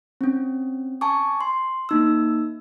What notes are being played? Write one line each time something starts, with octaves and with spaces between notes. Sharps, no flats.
C4 C#4
G#5 A5 C#6 D6
C6
A#3 D#4 E6